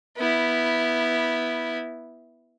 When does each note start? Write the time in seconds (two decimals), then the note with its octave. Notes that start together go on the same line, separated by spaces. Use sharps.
0.17 B3 E4